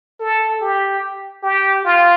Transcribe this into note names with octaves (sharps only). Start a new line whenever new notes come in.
A4
G4
G4
F4